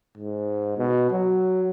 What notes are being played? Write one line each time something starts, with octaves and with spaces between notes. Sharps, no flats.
G#2
B2
F#3